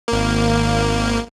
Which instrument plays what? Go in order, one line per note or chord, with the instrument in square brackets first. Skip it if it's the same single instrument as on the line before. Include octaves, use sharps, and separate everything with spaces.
[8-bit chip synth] G#1 A#3